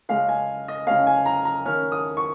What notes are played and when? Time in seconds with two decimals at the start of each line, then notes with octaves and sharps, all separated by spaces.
0.09 C#3 G#3 C#4 F5
0.29 G#5
0.68 D#5
0.87 C#3 G#3 C#4 F5
1.07 G#5
1.26 A#5
1.45 A#5
1.66 D#3 C#4 F6
1.92 D#6
2.17 C#6